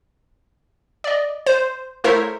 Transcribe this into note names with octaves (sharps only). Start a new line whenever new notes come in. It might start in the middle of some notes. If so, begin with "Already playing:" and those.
D5 D#5
C5
A3 E4 A#4 C5 C#5 E5